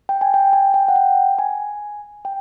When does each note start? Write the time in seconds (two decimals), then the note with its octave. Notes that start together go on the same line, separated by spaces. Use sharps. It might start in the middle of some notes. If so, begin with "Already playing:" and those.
0.09 G5
0.21 G#5
0.34 G5
0.53 G#5
0.74 G5
0.88 F#5
0.96 G5
1.39 G#5
2.25 G5